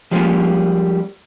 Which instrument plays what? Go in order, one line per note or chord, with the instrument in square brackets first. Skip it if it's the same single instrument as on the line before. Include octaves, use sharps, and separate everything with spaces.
[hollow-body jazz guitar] F3 G3 G#3 A#3 C#4 F4